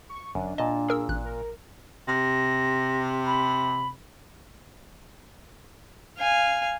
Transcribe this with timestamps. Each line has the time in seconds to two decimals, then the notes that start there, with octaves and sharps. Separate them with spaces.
0.10 C#6
0.35 G1 F#2 D4
0.58 A#2 D#5 A5
0.88 G#4 A#4 E6
1.09 A1 F#6
1.25 A#4
2.08 C3 A#6
3.26 B5
6.18 F5 G#5